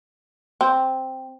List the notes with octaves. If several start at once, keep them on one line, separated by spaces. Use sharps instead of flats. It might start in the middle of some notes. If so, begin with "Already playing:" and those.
C4